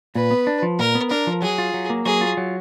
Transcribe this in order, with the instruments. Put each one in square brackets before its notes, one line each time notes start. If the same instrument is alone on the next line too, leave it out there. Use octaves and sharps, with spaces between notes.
[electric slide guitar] A#2 [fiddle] B4
[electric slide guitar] B3
D4
F3
[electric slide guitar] A#2 [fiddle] A#4
[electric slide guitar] B3
[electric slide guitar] D4 [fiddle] A#4
[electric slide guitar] F3
[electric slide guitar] F#3 [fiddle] G#4
[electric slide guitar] F4
F#3
A#3
[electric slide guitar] F#3 [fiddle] G#4
[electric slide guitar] F4
F#3